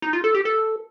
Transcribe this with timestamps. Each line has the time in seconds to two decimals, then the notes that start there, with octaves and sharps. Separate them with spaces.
0.02 D#4
0.13 F4
0.24 A4
0.35 G4
0.45 A4